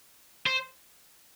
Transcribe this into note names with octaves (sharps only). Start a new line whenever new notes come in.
C5